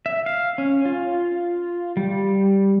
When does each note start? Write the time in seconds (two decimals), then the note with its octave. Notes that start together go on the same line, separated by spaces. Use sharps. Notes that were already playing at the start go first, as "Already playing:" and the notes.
0.06 E5
0.26 F5
0.58 C#4
0.85 F4
1.97 G3